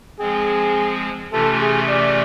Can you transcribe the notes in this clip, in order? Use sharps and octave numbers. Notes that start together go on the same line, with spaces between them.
F3 G#3 C4 G#4
C3 E3 A3 C#4 F4 A4
G#4
D5